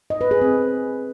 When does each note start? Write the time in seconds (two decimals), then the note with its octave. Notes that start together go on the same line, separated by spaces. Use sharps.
0.10 D#5
0.21 B4
0.31 G#4
0.41 C4